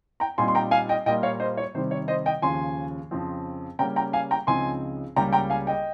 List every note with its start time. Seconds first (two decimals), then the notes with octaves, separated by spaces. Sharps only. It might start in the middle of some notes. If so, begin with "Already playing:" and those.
0.20 G5 A#5
0.38 A#2 G3 C4 D#4 G#5 C6
0.48 C6
0.55 G5 A#5
0.71 F5 G#5
0.89 D#5 G5
1.06 A#2 G3 A#3 F4 D#5 G5
1.23 C#5 F5
1.40 C5 D#5
1.57 C#5
1.74 C3 D#3 G3 C5
1.91 C#5
2.08 C5 D#5
2.26 D#5 G5
2.42 D#2 C#3 F3 G#5 C6
3.11 F2 C#3 F3 C4
3.79 C#3 G3 A#3 C#4 G5 A#5
3.96 G5 A#5
4.13 F5 G#5
4.31 G5 A#5
4.47 C#2 C#3 F3 C4 D#4 G#5 C6
5.16 C#2 C#3 G3 A#3 C#4 G5 A#5
5.33 G5 A#5
5.50 F5 G#5
5.67 D#5 G5